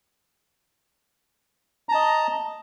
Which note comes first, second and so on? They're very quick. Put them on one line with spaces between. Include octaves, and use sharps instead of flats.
A#5 A5 D#5